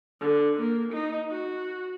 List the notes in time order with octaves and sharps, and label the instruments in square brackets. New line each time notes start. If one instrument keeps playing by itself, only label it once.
[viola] D3
A#3
D#4
F#4